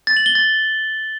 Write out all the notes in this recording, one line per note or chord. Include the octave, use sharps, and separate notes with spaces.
A6
F#7
G7
A6